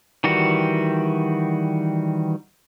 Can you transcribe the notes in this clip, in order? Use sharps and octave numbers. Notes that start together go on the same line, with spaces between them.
D#3 E3 G3 F#4